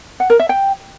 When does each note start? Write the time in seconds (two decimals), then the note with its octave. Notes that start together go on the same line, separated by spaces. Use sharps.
0.20 F#5
0.30 A#4
0.39 E5
0.49 G5